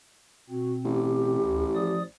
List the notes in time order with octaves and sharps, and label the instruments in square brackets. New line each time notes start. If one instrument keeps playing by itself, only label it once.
[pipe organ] B2 C4 [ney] F#4
[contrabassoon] A1 [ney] G4
[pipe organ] D2 E4
F3 D5 D#6